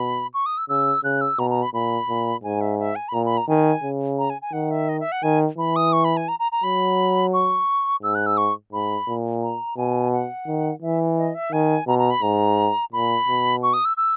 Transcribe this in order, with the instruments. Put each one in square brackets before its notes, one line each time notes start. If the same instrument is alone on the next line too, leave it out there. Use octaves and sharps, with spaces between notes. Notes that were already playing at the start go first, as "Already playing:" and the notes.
Already playing: [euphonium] B2 [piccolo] B5
[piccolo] C#6
D#6
E6
[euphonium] C#3 [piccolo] E6
[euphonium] C#3 [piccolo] F#6
[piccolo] E6
[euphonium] B2 [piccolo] A#5
[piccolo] A#5
B5
[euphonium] A#2 [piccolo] B5
[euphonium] A#2
[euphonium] G#2 [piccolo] G#5
[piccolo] E5
E5
G#5
B5
[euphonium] A#2 [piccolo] A#5
[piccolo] B5
A#5
[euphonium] D#3 [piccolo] G#5
[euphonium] C#3
[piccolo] A#5
G#5
G#5
[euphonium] D#3 [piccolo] F#5
[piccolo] E5
D#5
E5
F#5
[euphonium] D#3 [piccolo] G#5
[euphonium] E3 [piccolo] B5
[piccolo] D#6
C#6
B5
G#5
A#5
A#5
A#5
[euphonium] F#3 [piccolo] B5
[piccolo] C#6
[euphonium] G#2 [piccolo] E6
[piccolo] F#6
E6
C#6
[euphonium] G#2 [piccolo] B5
[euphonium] A#2
[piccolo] A#5
[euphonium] B2 [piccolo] G#5
[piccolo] F#5
[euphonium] D#3
[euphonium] E3 [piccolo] E5
[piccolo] D#5
E5
[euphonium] D#3 [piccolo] G#5
[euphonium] B2 [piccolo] A#5
[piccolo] A#5
B5
[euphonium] G#2 [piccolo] A#5
[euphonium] A#2 [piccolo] B5
[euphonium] B2
[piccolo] C#6
D#6
E6
E6